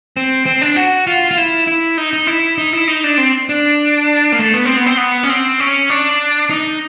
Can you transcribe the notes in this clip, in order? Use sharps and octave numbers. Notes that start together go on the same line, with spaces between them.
C4
C4
D4
F#4
F4
F4
E4
E4
D#4
D#4
E4
D#4
E4
D#4
D4
C4
D4
A#3
A3
B3
C4
B3
C4
B3
C#4
C4
C#4
D4
D#4